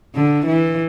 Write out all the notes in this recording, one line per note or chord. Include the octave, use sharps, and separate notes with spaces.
D3
E3